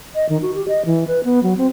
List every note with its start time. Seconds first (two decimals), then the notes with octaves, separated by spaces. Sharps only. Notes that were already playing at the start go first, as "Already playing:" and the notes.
0.15 D#5
0.29 D#3
0.42 F#4
0.55 G4
0.68 D#5
0.85 E3
1.08 B4
1.24 B3
1.43 F#3
1.58 C4